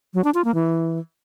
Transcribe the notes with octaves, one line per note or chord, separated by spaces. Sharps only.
F#3
D4
F4
A#3
E3